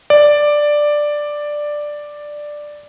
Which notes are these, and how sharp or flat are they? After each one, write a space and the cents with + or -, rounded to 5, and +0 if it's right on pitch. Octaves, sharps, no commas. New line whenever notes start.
D5 +5